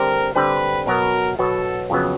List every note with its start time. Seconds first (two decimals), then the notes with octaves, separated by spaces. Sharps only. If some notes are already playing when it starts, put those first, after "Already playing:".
Already playing: D3 G3 C4 A#4
0.36 D3 G3 C4 B4
0.87 B2 F#3 B3 A#4
1.39 B2 F#3 B3 A4
1.90 F2 C#3 F#3 B3